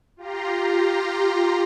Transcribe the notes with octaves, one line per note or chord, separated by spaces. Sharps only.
F4 G4 A#5 C6